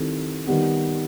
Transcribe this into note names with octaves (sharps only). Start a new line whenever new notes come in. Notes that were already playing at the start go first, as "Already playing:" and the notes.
Already playing: D#3 G3 C4 E4 A4
D#3 G3 B3